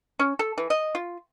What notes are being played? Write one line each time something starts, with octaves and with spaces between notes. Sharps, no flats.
C#4
A4
E3
D#5
F4